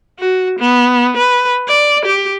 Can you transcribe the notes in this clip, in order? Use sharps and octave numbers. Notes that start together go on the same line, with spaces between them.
F#4
B3
B4
D5
G4